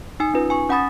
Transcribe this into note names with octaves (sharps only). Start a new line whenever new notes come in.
D#4 G#5 D#6
C#4 D#4 F4 B4
G#5 C#6
C#4 F#5 G#5 B5 D#6 A6